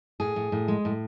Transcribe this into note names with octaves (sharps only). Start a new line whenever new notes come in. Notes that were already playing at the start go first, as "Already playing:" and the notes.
A2 G#4
A2
A2
G#3
A2